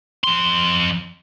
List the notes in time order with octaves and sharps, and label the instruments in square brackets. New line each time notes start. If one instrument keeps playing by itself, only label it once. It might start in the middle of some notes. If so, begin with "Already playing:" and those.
[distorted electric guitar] F2 C6